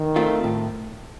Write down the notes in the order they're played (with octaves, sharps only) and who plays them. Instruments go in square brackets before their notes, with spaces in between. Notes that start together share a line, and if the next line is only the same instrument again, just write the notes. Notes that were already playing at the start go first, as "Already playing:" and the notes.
Already playing: [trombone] D#3
[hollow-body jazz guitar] A3 C4 F4
A2